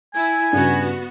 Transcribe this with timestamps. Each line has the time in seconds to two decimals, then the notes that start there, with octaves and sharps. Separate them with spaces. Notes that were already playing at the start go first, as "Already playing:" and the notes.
0.15 E4 G#5
0.53 G2 C#3 B3 F#4